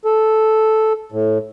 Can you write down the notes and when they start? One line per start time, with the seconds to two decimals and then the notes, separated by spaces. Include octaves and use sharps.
0.05 A4
1.12 A2